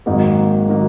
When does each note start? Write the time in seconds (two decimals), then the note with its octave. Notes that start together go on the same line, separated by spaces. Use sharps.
0.06 G#1 G#2 D#3 F#3 A#3
0.69 D#3 F#3 A#3